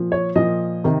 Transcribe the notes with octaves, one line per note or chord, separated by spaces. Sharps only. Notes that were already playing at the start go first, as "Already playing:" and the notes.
Already playing: A#2 F3
C#5
A#2 F3 D#5
C3 D#3